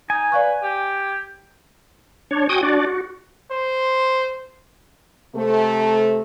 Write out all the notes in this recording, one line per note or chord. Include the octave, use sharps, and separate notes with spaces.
D#4 G#5
B4 D5 F5 C#6
G4
D4 C#5
F#4 G5 G#5 D#6
D4 F#4 D5
F#4
C5
C3 A3